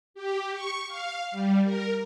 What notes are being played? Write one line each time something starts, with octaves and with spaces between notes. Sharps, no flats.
G4
C#6
F5
G3
A#4